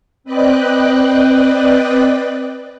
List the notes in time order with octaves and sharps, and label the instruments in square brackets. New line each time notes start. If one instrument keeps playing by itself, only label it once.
[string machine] C4 B4 D5 D#5 G5 F#6